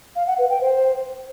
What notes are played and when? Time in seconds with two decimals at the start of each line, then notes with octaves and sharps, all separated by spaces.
0.15 F5
0.27 F#5
0.38 B4
0.49 G5
0.61 C5